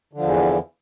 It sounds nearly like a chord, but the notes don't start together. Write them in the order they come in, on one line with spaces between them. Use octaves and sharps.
D3 F3 E2 E3